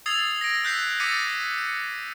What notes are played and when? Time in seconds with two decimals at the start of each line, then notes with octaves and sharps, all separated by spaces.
0.06 D#6 E6 G#6 A6 C7 F7
0.41 A#6 D7
0.64 E6 F#6 G6 B6 C7
1.00 D6 E6 A6 B6 C#7 D#7
1.58 C#7